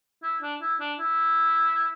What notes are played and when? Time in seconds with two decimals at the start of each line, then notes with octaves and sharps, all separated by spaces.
0.23 E4
0.42 D4
0.61 E4
0.80 D4
0.99 E4